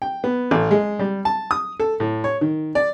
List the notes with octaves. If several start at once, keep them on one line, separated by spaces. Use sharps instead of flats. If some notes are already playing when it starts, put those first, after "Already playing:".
G5
B3
A1
G#3
G3
A5
D#6
A4
A2
C#5
D#3
D5